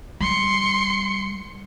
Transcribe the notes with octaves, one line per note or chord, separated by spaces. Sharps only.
G3 C6 C#7